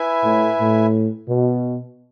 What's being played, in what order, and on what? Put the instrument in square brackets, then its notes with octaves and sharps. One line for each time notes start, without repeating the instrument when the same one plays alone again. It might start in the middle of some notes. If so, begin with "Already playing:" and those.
Already playing: [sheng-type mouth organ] E4 B4 E5 G#5
[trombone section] A2
A2
B2